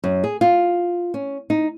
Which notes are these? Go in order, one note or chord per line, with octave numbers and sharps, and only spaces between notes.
F#2
G#4
F4
C#4
D#4